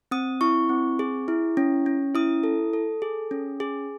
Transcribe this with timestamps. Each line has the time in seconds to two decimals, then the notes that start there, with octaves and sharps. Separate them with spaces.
0.11 C4 D#6
0.41 E4 C#6
0.69 C4
0.99 G#4
1.28 E4
1.57 C#4
1.86 C#4
2.15 E4 D#6
2.43 A4
2.73 A4
3.02 G#4
3.31 C#4
3.60 G#4